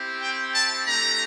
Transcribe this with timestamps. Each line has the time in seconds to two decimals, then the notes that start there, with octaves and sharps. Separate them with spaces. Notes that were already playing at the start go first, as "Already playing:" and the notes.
Already playing: C4 E4 G4
0.23 G5
0.55 A5
0.86 A3 D4 G4 A#5